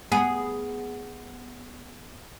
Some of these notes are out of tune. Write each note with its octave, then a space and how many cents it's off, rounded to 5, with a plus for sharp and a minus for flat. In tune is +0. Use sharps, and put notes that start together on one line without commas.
B3 +0 G#4 +0